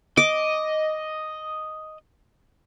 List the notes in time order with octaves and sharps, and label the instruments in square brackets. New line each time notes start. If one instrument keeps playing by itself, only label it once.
[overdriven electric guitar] D#5 [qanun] D6